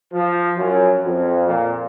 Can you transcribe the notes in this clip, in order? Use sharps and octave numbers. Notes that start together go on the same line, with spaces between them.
F3
F#2
F2
A#2